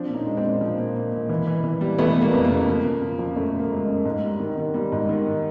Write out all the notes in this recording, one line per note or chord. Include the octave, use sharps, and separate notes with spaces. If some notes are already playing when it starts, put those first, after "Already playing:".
Already playing: F3 C4 D4
A#2
C#4 D#4
G#3
C4 D4
A#2
F3
A#2
A#2
A#2
E3
E3
E3
G3
E3 A3 B3
G3
A#3
F2
A#3
C#3
F3
C#3
F3
F3
F#2 A3
C#3
A#3
G#3
F#2
G#2
G3
D#3
D#3
G3
G#2
D#3